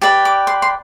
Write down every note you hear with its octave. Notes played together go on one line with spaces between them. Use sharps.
G4 B4 D5 A5
D6
C6
C6